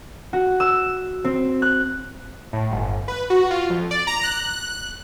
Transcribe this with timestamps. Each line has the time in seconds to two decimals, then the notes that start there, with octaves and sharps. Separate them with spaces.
0.33 F#4
0.60 E6
1.24 C4
1.62 F#6
2.53 A2
2.71 G1
3.08 B4
3.30 F#4
3.51 F4
3.70 F2
3.91 D5
4.07 A#5
4.23 F#6